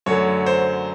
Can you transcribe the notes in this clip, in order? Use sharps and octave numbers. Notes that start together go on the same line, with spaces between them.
F#2 D3 F#3 A3 C#5
C5